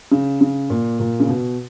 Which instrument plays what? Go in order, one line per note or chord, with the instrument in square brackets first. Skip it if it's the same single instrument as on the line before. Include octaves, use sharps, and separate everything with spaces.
[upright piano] C#3
C#3
A#2
A#2
C#3
B2